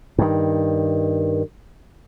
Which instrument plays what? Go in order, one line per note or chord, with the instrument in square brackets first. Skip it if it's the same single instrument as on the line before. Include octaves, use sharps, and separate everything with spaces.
[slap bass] G2 D#3